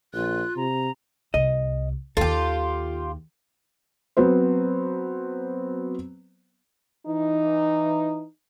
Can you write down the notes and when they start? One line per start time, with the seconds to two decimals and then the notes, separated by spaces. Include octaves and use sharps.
0.13 A#1 F4 F#6
0.57 C3 A#5
1.34 C2 D#5
2.17 D#2 D#3 F4 G4 A4
4.17 F#3 B3 C4 C5
7.06 E3 D#4